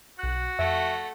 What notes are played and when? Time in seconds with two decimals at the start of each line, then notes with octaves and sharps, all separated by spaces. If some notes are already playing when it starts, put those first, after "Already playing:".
0.19 B1 F#4 F#6
0.59 F2 A3 E5 F#5